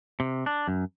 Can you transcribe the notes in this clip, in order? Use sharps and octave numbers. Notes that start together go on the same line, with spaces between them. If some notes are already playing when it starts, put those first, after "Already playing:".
C3
D4
F#2